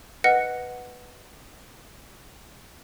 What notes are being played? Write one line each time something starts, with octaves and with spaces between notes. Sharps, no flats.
B4 D#5 F#5 F6 A#6 C#7